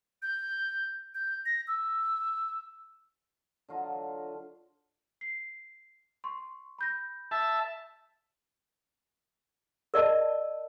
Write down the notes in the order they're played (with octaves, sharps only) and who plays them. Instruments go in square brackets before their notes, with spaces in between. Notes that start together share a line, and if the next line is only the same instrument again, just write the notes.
[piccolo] G6
G6
A#6
E6
[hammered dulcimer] D3 F#3 F4 D#5
[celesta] C7
C6 C#6
B5 G6 A#6
[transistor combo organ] E5 A5
[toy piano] A#4 D5 D#5 A5